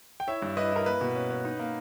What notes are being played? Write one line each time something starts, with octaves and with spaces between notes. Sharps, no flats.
G5
E4 C#5 E5
G2
E4 B4 D#5
E4 A#4
A#3 B4
B2
C#4
C#4
D#4
A#3